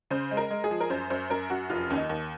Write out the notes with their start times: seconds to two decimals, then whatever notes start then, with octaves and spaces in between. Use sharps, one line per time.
0.11 C#3 C5
0.31 G#3
0.37 A#4
0.50 G#3
0.64 G#4
0.71 F3
0.80 A#4
0.90 F#2 C5
1.10 F#2 C5
1.30 F#2 A#4
1.50 F#2 F#4
1.70 F1 F4
1.90 D#2 C#4
1.97 D#4
2.09 D#2